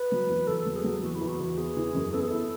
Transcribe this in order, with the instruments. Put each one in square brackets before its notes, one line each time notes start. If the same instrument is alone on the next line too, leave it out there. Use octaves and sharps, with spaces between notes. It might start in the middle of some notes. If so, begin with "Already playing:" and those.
Already playing: [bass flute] B4
[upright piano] F#3
E2
[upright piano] E2 [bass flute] A4
[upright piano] F#3
[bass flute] G#4
[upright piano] F#3
[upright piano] E2 [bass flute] F#4
[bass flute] E4
[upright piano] E2
[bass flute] F#4
[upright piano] E2
[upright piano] B3 [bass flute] G#4
[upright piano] E3
F#2
[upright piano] B3 [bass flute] A4
[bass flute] G#4
[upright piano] E4 [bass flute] A4